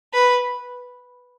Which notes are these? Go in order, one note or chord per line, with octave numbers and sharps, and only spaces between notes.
B4